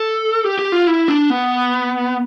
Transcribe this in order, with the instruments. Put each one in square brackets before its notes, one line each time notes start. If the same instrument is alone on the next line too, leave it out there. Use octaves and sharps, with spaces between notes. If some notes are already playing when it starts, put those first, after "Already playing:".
Already playing: [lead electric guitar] A4
G4
G4
F4
E4
D4
B3